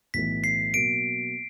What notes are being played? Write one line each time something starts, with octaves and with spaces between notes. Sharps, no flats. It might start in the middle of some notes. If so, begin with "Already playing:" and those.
B1 A2 E3 B6
C7
B2 F#3 A#3 D7